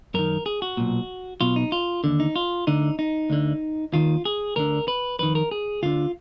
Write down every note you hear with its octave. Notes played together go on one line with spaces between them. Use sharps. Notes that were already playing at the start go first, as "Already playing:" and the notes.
F#2 D#3 A#4
G#4
F#4
B1 A#2
B1 B2 F4
D#4
F4
D#2 D3
D#4
F4
D2 D3 D#4
D#4
D2 D3
D#2 D#3 F4
G#4
D2 D3 A#4
B4
F2 D#3 B4
A#4
G#4
D2 D3 F4